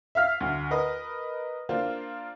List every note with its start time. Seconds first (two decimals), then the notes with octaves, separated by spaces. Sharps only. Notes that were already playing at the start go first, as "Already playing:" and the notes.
0.15 E5 F5 F6 B6
0.40 D2
0.71 A#4 B4 D#5
1.69 A#3 D4 F4 C5